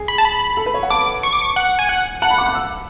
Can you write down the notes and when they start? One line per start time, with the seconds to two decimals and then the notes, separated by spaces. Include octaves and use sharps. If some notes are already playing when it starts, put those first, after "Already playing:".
Already playing: G#4
0.08 B5
0.18 A5
0.25 B5
0.57 A4
0.66 B4
0.74 C#5
0.83 F#5
0.90 A5 D6
1.23 C#6
1.33 D6
1.42 C#6
1.56 F#5
1.79 G#5
1.89 F#5
2.22 F#5 A5
2.30 B5
2.38 D6
2.46 F#6
2.55 E6